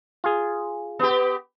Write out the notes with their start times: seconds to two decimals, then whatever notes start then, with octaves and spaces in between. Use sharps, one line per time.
0.24 F4 G#4
0.99 B3 G4